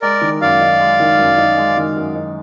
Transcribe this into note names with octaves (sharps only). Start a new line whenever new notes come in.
G#3 A#4 D5
D#3
F#2 D5 F5
D#4
G#3
D#3
F#2
D#4
G#3
D#3
F#2
D#4